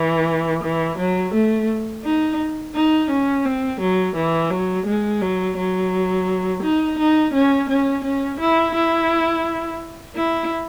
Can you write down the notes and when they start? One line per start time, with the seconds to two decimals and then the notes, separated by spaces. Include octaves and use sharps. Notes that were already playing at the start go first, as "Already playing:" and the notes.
Already playing: E3
0.64 E3
0.98 F#3
1.34 A3
2.04 D#4
2.75 D#4
3.10 C#4
3.45 C4
3.81 F#3
4.16 E3
4.51 F#3
4.86 G#3
5.21 F#3
5.57 F#3
6.63 D#4
6.98 D#4
7.34 C#4
7.69 C#4
8.04 C#4
8.40 E4
8.75 E4
10.15 E4